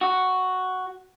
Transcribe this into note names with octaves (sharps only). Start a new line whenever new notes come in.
F#4